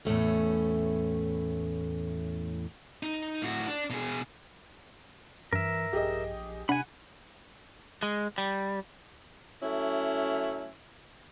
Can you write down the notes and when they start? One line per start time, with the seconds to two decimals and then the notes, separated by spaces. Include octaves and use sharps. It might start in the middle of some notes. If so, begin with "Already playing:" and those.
0.05 E2 A2 A3 C#4
3.03 D#4
3.42 A2 F#4
3.67 D4
3.90 B2 G#4
5.53 G2 E3 A#4 E5
5.93 A#1 G4 G#4 D#5
6.69 C3 D4 F#5 G#5 B5
8.03 G#3
8.38 G3
9.63 F#3 A3 C#4 E4